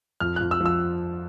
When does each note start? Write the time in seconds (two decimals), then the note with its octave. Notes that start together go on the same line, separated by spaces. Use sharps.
0.20 F2 F6
0.36 F2 F#6
0.51 E6
0.60 F3
0.66 E6